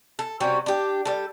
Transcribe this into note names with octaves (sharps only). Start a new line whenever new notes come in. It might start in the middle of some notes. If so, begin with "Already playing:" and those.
A4
C3 G3 C#4 F#4
D4 G4
G3 A4